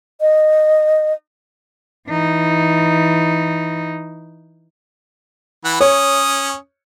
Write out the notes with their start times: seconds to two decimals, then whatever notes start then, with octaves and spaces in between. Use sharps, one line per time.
0.21 D#5
2.08 E3 D#4
5.65 E3 F#5 B5
5.80 C#4 C#5 D#6